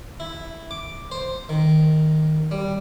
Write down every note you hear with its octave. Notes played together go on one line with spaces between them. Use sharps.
E4
D6
C5
D#3
G3